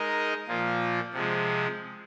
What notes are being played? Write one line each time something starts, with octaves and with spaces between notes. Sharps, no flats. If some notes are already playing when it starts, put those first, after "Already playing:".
Already playing: G#3 D#4 A#4 D#5
A#2 F3 A#3 F4
C3 F3 G#3